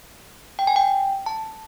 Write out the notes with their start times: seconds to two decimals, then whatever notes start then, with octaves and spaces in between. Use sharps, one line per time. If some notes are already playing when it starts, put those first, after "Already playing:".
0.59 G5
0.67 G#5
0.76 G5
1.26 A5